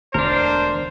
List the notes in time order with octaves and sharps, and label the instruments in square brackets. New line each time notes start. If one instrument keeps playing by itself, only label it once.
[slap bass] E1 D2 [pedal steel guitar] D4 A#4 [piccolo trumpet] C5